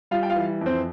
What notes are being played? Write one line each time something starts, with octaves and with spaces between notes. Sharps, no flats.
G3 F4 F5
G5
F4 F5
E3
F2
C4 C5